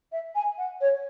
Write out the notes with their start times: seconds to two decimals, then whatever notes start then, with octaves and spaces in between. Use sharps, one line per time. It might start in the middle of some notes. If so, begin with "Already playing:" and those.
0.12 E5
0.35 G#5
0.57 F#5
0.80 C#5